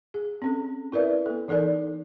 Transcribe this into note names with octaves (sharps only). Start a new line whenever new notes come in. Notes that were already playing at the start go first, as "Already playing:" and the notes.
G#4
C4 C#4 A4
E4 A#4 B4 D5 E5
B3 A4
E3 D#4 A4 A#4 D5